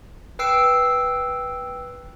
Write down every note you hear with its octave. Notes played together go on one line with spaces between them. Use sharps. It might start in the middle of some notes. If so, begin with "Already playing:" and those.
B4 G5 E6 C7 D7